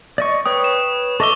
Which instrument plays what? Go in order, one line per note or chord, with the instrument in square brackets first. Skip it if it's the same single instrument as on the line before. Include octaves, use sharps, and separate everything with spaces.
[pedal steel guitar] D5 D#5 C#6
[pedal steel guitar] B4 C#5 G5 [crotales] D#6
[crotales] E7
[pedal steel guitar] A4 D#5 E5 [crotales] C#6 D6 G7